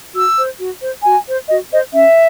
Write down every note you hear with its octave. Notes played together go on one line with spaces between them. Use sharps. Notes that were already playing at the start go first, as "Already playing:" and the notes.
F#4 E6
C5
F#4
C5
F#4 G#5
C5
F#4 D#5
C5 D#5
C#4 E5